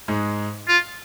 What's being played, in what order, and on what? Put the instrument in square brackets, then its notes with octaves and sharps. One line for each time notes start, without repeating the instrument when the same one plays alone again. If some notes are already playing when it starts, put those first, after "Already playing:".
[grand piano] G#2 G#3
[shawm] F4